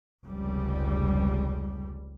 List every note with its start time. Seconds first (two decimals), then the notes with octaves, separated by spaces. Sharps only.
0.25 F1 C#2 G3